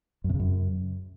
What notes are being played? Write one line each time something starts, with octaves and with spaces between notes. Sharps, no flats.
F#2
C3
C#3
F#2